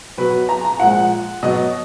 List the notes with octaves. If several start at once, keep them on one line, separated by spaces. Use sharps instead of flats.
B2 F#3 B4
A#5
A#5
A#2 F3 G#3 F#5
B2 F#3 D#5